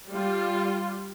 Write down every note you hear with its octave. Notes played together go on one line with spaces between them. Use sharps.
G3 F4